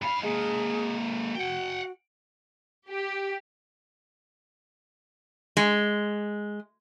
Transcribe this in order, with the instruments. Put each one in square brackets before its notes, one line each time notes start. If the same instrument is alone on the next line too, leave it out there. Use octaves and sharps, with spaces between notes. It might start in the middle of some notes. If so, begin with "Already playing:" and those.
[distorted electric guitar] G2 F5 [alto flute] B5
[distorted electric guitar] G#3 A#3 [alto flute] G#4
[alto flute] F#4 [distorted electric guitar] F#5 G5
[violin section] G4
[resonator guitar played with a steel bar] G#3